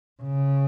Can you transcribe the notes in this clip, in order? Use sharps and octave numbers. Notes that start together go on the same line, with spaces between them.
C#3